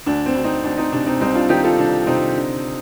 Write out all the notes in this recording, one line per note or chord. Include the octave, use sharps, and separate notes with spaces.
D2 D4
C4
D2
C4 D#4
D2 D4
C4 D#4
C3 D4
C4 D#4
C2 C4 D#4
D4 F4
D#3 D#4 G4
F4 A4
C2 D4
C3 C4 D#4
D3